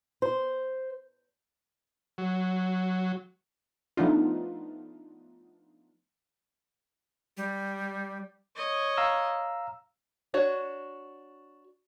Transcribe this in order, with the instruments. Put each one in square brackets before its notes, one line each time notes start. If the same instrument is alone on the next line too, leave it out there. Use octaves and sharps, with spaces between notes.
[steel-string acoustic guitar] C5
[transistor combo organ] F#3
[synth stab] F3 A3 B3 D4 D#4 F4
[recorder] G3
[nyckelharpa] C#5 D#5
[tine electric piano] F5 A#5 E6
[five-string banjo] D4 F#4 C#5